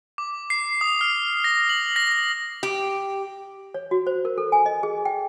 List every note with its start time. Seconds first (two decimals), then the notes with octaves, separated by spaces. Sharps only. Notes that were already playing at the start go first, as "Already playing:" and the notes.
0.18 D6
0.50 C7
0.81 D#6
1.01 F6
1.44 A#6
1.69 F#7
1.96 A#6
2.63 G4
3.74 C#5
3.91 F#4
4.07 C5
4.25 A#4
4.38 A4
4.52 G#5
4.66 D#5
4.83 G#4
5.05 G5